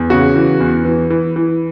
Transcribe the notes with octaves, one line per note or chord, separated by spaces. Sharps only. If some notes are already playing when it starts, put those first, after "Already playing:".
Already playing: E2
C#3 F#4
E3
E2
E3
E3
E3